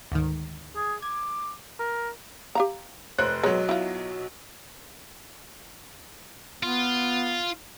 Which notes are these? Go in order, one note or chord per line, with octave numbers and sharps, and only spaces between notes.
D2 G#2 D#3
G#4
D6 G#6
A#4
G4 F5 A#5
F1 C5 C#5 F#6
B1 F#3 G#3 B4 C#5
E4 F4
B3 F4